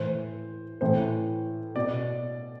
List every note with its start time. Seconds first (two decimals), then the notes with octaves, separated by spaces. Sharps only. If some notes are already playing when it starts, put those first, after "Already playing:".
Already playing: A2 E3 C5
0.81 A2 E3 C5
1.76 B2 D5